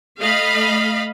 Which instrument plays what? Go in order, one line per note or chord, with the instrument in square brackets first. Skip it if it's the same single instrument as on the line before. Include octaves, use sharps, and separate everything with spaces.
[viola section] A3 D#5 F5 B5